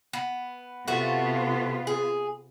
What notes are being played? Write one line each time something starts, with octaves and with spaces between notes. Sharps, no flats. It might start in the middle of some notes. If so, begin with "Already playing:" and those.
B3
C3 A3 B3 F4 F#4
G#4